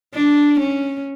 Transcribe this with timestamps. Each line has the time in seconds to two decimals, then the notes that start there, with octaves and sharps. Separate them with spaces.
0.14 D4
0.60 C#4